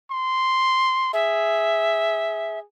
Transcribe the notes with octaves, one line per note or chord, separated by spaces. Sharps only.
C6
G#4 E5